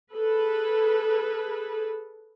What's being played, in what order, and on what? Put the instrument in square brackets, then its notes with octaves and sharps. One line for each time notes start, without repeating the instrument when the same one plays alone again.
[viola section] G#4 A4 B4